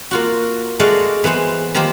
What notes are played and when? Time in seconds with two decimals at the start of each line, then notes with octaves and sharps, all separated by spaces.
0.11 A#3 F4 F#4
0.80 G#3 A3 F#4 D5 D#5 F5
1.24 E3 B3 G#4 C5
1.74 D#3 F3 A#3 D#4 G4 C5